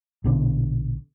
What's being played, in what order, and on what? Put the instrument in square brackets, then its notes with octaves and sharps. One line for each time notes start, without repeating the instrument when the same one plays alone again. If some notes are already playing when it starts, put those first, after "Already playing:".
[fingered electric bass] A#1 B2 D3